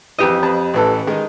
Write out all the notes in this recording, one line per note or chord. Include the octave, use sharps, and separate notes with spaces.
F2 E3 G4 D#5
F2 B4
A1 E3 A4
D#3 G#3 D#4